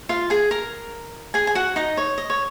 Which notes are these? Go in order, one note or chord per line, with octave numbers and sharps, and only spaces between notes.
F4 F5
G#4 G#5
A#4 A#5
G#4 G#5
G#5
F#4 F#5
D#4 D#5
C#5
D#5
C#5